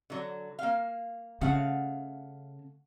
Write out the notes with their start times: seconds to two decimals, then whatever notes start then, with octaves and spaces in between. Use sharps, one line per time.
0.10 D3 F#3
0.59 A#3 F5
1.41 C#3 A3 F5 F#5